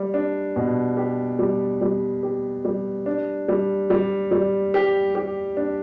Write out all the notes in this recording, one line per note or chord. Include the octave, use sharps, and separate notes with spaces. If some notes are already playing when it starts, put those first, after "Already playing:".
Already playing: G3
D4
B2
G4
G3
G3
G4
G3
D4
G3
G3
G3
G4
G4
D4